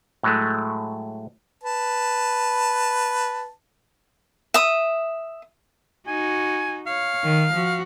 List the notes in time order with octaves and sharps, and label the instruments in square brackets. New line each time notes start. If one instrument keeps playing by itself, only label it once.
[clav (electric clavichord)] A2 F#3 G#3 A3
[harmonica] B4 A5
[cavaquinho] E5 D#6
[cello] D#4 F#4 [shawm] G#5
[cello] C#5 [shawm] F5
[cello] D#3
F3 F#4